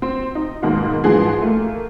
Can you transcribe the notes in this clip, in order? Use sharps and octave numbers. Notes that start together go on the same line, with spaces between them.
C4
D#4
G#2 B2 D#3 A#3 F#4
G#2 E3 F3 F#4 G#4
A3 A#3